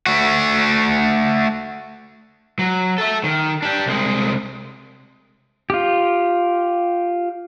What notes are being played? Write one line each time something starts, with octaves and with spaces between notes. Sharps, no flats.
A3 F#4
F#3
A4 E5
D#3
D4 G4
C2 G#3
F4 G4